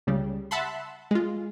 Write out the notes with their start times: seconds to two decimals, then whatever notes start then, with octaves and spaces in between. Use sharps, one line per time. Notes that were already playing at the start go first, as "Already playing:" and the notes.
0.07 C#2 C#3 G3
0.51 E5 F#5 A5 B5 C6
1.11 G#3 F4